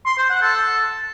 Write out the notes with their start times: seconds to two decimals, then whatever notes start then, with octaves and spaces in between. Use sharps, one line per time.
0.06 C6
0.18 C5
0.30 F#5
0.42 A4